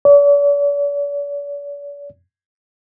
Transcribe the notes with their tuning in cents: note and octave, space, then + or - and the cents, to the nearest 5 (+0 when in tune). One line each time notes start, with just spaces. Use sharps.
D5 -45